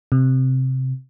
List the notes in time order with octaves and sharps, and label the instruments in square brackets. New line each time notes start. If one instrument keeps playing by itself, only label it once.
[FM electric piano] C3